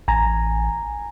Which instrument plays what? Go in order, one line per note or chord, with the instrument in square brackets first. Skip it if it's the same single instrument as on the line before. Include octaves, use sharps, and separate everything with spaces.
[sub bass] A1 [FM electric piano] G#5 A#5